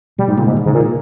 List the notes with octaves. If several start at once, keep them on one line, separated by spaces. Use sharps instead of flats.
B2 G3
G#2
A#2 C#3
G#2
D#3
G#2
C#3
A#2
D#3